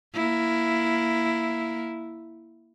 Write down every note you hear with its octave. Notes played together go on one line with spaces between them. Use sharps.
A#3 E4